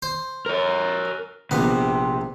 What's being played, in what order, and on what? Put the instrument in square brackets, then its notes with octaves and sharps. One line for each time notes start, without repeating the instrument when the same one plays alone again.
[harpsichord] C5
[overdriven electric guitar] A#4 C#5
[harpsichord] A#1 B3 [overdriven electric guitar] C3